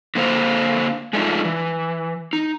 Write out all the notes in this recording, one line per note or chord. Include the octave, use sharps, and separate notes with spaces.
D3 A#3 C5 F5
G#3 A3 D4 D#4 F4
E3
D#4